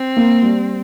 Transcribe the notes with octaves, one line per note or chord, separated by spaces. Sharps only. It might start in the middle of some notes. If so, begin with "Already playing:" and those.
Already playing: C4
A#3
G3